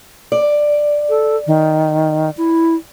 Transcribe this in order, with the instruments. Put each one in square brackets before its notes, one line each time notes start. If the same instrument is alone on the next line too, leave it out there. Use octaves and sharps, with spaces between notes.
[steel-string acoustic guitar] D5
[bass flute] A4
D#3
E4